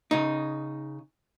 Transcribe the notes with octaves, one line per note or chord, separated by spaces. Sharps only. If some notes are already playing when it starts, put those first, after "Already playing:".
C#3 D#4